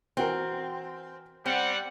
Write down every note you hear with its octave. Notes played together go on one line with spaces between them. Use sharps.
E3 C4 F#4 A#4
G3 C4 F#5